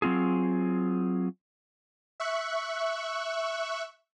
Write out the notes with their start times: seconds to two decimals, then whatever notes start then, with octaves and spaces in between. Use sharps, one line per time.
0.02 F#3 C4 F4 G#4
2.20 E5 C#6 F#6